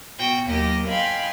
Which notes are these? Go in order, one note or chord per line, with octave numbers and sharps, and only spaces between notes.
B2 F#4 G5
D#2 F#3 A#3 G4 D#5 A#6
D#5 F5 G5 G#5 B5 C6